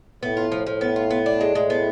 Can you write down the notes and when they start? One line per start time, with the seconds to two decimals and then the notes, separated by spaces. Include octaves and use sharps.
0.22 A2 B3
0.37 F4
0.52 F3
0.66 A2 F3
0.81 B3
0.96 F4
1.11 B3
1.26 D4
1.41 G#3
1.55 A2 G#3
1.70 B3